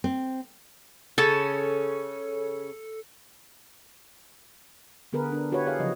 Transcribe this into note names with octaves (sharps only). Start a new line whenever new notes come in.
C4
C#3 C#4 A4 A5
D3 B3 G#4 A#4 B4
D4
E4 F#4 G4 B4 C#5
G#4 C#5 F5
C#3 F3 F#3 D#5